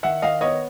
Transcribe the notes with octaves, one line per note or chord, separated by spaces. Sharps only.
D#3 E5 F#5
D#3 D#5 F5
B3 C#5 D#5